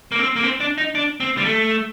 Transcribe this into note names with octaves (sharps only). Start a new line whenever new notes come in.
A#3
C4
A#3
C4
D4
D#4
D4
C4
G3
A3